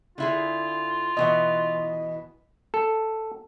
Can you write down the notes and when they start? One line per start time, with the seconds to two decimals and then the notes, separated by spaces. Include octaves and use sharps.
0.18 D3 E4 F4 G#4
1.17 B2 E3 B3 D#5
2.74 A4